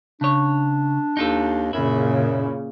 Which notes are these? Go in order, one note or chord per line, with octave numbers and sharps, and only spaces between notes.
C#3 D4 C#5
D#2 D#4 F4 A4
F#2 A#2 C#3 E4